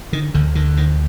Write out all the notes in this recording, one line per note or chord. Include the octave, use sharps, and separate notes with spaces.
D3 D#3
D2 D3
D3 D#3
D2 D#3